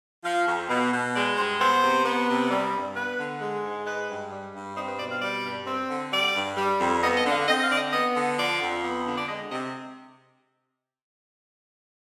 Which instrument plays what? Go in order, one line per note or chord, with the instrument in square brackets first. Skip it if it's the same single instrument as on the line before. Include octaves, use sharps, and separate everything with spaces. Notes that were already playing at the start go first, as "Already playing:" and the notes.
[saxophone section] F3 F5
F2
B2
B2
G#3 D5
G2 C5
B3 C5
C3
B3
C3
G3
G2
B3 B4
D3
G#3
G#2
G#3 B4
G2
G3
G2
C4 D#4
B4
B2 D5
F5
G3 D5
G2
C4
D3
G3 D5
G2
G3
F2
B3 D#5
D#5
D3
F5
C4 D#5
F5
D3 D5
D#5
B3 D#5
D3
F3 D5
F2
B3
D3
D5
G#3 D#5
C3 D#5